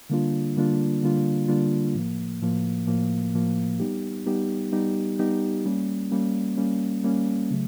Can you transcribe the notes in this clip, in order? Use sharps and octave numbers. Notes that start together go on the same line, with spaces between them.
D3 G3 A#3 D4 F4
D3 G3 A#3 D4 F4
D3 G3 A#3 D4 F4
D3 G3 A#3 D4 F4
A2 F3 A#3
A2 F3 A#3
A2 F3 A#3
A2 F3 A#3
G3 B3 D#4 G4
G3 B3 D#4 G4
G3 B3 D#4 G4
G3 B3 D#4 G4
G3 A#3 C#4
G3 A#3 C#4
G3 A#3 C#4
G3 A#3 C#4
C#3 F#3 A3